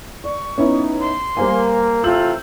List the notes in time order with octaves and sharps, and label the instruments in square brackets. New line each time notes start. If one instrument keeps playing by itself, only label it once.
[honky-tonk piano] D5 [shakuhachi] C#6
[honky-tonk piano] B3 C#4 E4 [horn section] D#4
[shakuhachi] C6
[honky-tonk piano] G3 C5 G#5 [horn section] A#3
[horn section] C3 E3 A3 [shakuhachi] F4 [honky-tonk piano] E6 G6 F#7